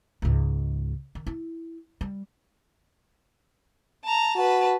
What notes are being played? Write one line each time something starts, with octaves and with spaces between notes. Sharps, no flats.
C#2 G#2
D#3
E4
G3
A5 A#5
F#4 B4 A5